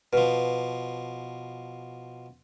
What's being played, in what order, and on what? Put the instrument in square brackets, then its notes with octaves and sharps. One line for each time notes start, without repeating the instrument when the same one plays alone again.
[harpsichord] B2 F3 [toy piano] B4